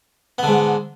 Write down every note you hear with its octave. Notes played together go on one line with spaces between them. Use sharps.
G#2 D3 B3